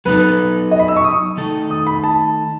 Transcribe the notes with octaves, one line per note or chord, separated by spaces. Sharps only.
F#3 B3 D#4 A4 B4
D#5
B5
E6
C#6
D#6
D#3 A3 D#4 A4
D#6
B5
A5